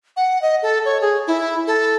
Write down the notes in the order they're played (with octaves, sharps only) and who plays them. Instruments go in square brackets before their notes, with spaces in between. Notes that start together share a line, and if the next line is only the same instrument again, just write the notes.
[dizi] F#5
D#5
A4
C#5
G#4
E4
A4